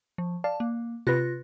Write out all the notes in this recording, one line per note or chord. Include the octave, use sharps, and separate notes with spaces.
F3
D5 F5 A5
A#3
C3 F4 B4 F#6 A#6